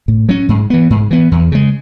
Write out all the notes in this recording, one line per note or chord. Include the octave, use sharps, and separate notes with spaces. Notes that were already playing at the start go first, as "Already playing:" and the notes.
A2
F#3 C#4
G#2
E3 B3
G#2
E3 B3
E2
C#3 G#3